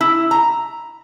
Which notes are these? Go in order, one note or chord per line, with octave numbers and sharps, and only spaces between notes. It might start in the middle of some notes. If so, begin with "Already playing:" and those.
E4
A#5